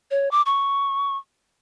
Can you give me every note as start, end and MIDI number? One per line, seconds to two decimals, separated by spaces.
0.11 0.31 73
0.31 0.42 86
0.46 1.17 85